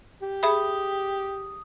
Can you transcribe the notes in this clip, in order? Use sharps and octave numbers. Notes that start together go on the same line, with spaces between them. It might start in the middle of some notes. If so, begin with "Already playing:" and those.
G4
G#4 E5 B5 D#6